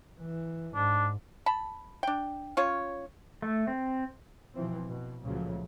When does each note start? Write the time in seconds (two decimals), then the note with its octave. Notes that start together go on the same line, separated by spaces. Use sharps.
0.21 E3
0.75 G#2 D4
1.46 A5 B5
2.03 D4 G5
2.57 C#4 F4 C#5
3.42 A3
3.67 C4
4.54 B2 E3 F3 C4
4.88 B2
5.23 C#2 A#2 C#3 F3 F#3 A3